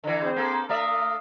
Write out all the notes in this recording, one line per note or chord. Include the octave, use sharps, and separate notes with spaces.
D3 E3
C4 G#4 C5
A#3 A4
A3 D5 E5 F5 A#5 D#6